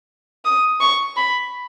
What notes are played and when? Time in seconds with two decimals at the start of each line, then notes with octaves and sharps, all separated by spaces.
0.45 D#6
0.81 C#6
1.16 B5